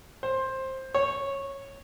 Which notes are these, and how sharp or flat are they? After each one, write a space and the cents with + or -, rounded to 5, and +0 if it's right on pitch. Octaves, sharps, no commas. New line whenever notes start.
C5 +15
C#5 -10